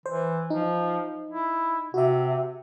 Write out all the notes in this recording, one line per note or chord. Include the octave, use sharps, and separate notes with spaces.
E3 C5
F3 D#4
E4
C3 F#4 E5